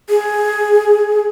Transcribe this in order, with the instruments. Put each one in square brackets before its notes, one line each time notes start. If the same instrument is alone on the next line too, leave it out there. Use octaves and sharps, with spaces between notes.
[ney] G#4